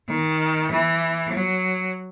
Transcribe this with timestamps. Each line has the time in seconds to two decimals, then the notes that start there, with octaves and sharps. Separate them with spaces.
0.09 D#3
0.71 E3
1.33 F#3